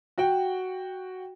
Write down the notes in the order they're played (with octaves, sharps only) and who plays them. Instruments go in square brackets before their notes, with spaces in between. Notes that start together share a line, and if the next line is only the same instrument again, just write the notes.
[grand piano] F#4 F#5 G5